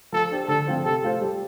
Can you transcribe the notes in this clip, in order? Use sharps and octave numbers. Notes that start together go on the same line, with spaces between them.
F3 A4
D4 G4 C5
D3 A4
F3 C4 F4 C5
C3 A4
A3 F4 A4 C5
G3